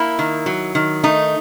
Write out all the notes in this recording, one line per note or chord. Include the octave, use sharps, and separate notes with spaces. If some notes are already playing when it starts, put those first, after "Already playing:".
Already playing: A#3 E4
D#3
F#3
D#3
A3 D#4